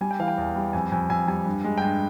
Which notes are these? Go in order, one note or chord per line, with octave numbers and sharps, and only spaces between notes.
G3 G#5
G5
E3 F5
G5
E2
G3
F2 G#5
F2 G#5
F2 G#5
G3 G#5
G2
G#3
G5
G2 G#5